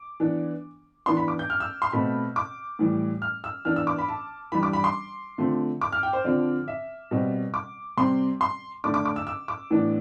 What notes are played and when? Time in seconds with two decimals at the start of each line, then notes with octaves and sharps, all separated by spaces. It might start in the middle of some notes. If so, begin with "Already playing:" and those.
Already playing: D6
0.20 E3 B3 D4
1.06 E3 B3 D4 C6
1.17 B5
1.28 D6
1.39 G6
1.50 F6
1.60 E6
1.82 C6
1.92 B2 A3 C4 B5
2.36 D6
2.79 A2 E3 G3
3.22 F6
3.44 E6
3.65 E3 B3 D4 F6
3.76 E6
3.87 D6
3.98 B5
4.09 A5
4.52 E3 G3 D4 B5
4.63 D6
4.73 B5
4.84 C6
5.38 D3 F3 A3 C4
5.81 D6
5.92 F6
6.03 G5
6.13 C5
6.24 D3 F3 C4 D5
6.68 E5
7.11 B2 G3 C4
7.54 D6
7.97 C3 G3 C4 C6
8.41 C6
8.84 D3 A3 D4 D6
8.94 D6
9.05 D6
9.16 E6
9.27 E6
9.48 D6
9.70 A2 E3 B3 D4